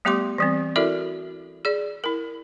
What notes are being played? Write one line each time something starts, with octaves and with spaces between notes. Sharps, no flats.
G3 A3 B3 G4 C6 D6
E3 G3 C4
E4 F#4 A4 A#4 D5 E5
G#4 D5
E4 A#4